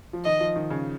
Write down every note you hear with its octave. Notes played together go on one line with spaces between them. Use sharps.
F3
D#3 D#5
F3
D#3
C#3